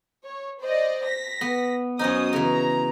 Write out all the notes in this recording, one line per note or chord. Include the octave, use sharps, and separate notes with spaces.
C#5
C5 D5 D#5
A#6 B6
B3
F#2 C#4 D#4 C5 G#5 D#6
C#3 E3 A#5